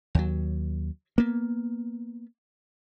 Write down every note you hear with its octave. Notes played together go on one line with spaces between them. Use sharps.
D#2 F#3
A#3 B3